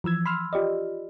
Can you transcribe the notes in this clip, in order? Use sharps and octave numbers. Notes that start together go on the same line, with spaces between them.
E3 F3 E6 G#6
B5 C6 E6 F6
F4 G4 D5 D#5